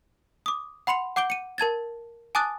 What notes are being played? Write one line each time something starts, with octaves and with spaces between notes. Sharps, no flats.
D6 D#6
F#5 B5 C6 C#7 F7
F#5 D6 G6 D7 G7
C#7 D#7
A#4 A5 G#6 A6
G#5 A5 D6 D#6 F#6 A6